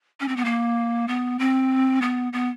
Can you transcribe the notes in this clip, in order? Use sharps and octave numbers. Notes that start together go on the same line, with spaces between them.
C#4
C4
B3
A#3
B3
C4
B3
B3